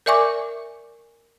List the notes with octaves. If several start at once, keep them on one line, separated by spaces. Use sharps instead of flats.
A#4 D5 E5 G#5 C#6 D6